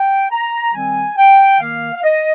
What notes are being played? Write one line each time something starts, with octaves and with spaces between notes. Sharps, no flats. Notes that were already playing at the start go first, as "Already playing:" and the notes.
Already playing: G5
A#5
D#3 G3 C4 G#5
G5
D#3 A#3 F5
F5
D#5